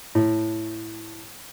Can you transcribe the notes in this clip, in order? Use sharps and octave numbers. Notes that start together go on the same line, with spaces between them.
A2